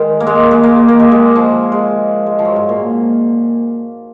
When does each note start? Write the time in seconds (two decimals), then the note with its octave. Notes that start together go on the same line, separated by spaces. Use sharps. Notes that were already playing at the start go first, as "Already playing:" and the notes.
Already playing: D#3 G#3
0.20 A#3
0.27 G#3
0.51 G#3
0.64 A#3
0.88 A#3
1.00 G#3
1.12 G#3
1.36 F3
1.72 G#3
2.27 G#3
2.39 F3
2.45 F#3
2.56 G#2
2.69 A#2